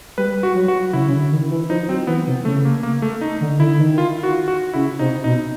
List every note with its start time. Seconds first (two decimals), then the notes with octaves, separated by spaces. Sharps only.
0.18 G3 B4
0.43 F#4
0.55 F#3
0.68 F#4
0.93 C#3 E4
1.07 C#3
1.13 D3
1.31 D#3
1.50 E3
1.70 F3 D#4
1.88 F#3 C4
2.07 E3 B3
2.27 C3
2.45 C#3 A3
2.65 A#3
2.83 A#3
3.02 A3
3.21 D#4
3.41 D3
3.59 D3 E4
3.79 D#3
3.98 F4
4.23 F#4
4.48 F#4
4.74 C#3 E4
4.99 C3 D#4
5.24 B2 D#4